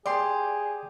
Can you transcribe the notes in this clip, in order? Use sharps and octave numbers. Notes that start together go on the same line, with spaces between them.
G4 G#4 D5 C6